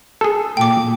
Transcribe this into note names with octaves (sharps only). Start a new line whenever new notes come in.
G#4 A4
A#2 G5 D6